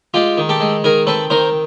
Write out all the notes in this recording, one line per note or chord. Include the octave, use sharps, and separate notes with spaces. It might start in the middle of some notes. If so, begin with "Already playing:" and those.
G#3 F4 G4
D#3
G4 A4
G#3
D#3 G#4 A#4
C4 A4 B4
D#3 A#4 C5